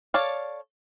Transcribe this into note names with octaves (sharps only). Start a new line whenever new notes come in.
A4 C#5 D5 F5